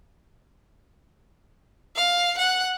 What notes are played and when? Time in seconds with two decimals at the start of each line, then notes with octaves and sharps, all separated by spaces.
1.96 F5
2.38 F#5